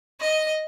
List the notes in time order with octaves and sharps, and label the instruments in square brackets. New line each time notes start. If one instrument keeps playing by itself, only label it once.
[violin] D#5